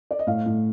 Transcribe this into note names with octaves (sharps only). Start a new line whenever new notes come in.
D5
D#5
A2 F5
A2